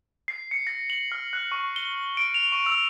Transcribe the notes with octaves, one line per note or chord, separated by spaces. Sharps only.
C7
C#7
A#6
F#7
F6
F#6
C#6
G7
D7
F7
C#6
E6